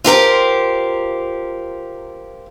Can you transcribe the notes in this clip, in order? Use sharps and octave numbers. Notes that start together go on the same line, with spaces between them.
F4 G4 A#4 C5